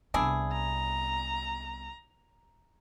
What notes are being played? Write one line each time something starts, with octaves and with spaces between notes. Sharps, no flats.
C2 B3 D4 E4 G#4
A#5